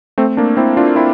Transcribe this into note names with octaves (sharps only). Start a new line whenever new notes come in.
A3 C4
A#3 D4
C4 E4
D4 F4
C4 E4